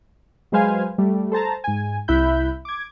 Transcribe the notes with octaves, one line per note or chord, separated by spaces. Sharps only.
F#3 G#3 B4 C5 F5 G#5
G3 A3
A4 C5 A5 A#5
G#2 G#5
C2 E4 E5 B5 F#6 G6
D6 G#6